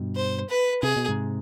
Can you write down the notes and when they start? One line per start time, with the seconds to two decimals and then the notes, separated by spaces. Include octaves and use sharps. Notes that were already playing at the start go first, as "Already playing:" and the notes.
Already playing: G2 B2
0.15 C5
0.49 B4
0.83 C3 G#4
0.96 B2
1.09 G#2 C3